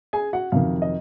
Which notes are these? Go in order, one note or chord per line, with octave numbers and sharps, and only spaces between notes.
G#4 G#5
F#4 F#5
F2 C3 D#3 F#3 F5
D#5